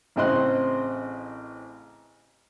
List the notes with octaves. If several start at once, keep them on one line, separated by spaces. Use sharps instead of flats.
A1 C#3 C4 D#5 C6 F#6